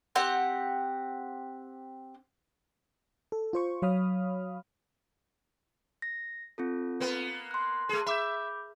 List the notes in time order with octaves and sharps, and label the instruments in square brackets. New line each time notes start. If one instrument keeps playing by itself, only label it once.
[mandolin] C4 G4 F#5
[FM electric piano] A4
F4 C5 C#6
F#3 C#5 F5 B5 D#6 F6
[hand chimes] A#6
C4 F4 A4
[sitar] A#3 B3
[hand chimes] C6 F#6
[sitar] A3 G#4
[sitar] E5 [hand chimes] B5 D6 G6